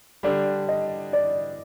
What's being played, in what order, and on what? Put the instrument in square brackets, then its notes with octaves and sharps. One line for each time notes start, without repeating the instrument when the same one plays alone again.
[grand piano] D3 G3 D4 [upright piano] D5
[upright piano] D#5
D5